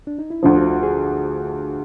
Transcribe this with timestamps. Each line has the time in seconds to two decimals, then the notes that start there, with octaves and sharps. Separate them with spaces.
0.07 D4
0.19 D#4
0.30 E4
0.43 D2 D3 F3 F4
0.57 F#4
0.83 G#4